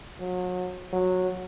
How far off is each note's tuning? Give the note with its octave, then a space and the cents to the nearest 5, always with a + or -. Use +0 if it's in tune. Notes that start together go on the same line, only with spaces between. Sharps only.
F#3 -30
F#3 -10